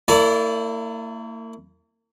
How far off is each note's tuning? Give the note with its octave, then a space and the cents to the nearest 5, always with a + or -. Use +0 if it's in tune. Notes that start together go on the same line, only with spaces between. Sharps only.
A#3 -40 E4 +0 D5 -15